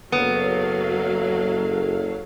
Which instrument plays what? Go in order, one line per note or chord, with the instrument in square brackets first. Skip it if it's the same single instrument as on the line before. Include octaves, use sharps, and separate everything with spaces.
[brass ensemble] F#1 A4 [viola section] F#3 F5 [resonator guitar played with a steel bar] B3